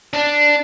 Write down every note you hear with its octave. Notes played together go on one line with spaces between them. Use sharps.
D4